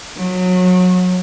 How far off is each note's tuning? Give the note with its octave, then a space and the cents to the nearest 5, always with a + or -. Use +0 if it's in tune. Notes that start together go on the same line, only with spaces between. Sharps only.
F#3 -25